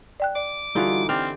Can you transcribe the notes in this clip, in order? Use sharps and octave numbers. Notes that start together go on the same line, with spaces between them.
D5 G5 F#6
D5 D6
D3 E3 G3 D#4 F4 F#4
C4 G4 D5 F6